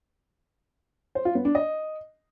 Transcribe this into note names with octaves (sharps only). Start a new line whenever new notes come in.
C5
F4
B3
D4
D#5